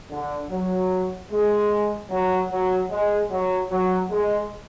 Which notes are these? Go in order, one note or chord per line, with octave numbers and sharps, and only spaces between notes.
D3
F#3
G#3
F#3
F#3
G#3
F#3
F#3
G#3